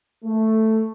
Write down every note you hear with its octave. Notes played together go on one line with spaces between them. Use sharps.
A3